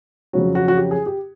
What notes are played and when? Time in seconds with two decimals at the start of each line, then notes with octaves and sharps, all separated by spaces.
0.33 F2 C#3 F#3 F#4
0.55 F#4
0.68 F#4
0.77 G4
0.91 G#4
1.06 G4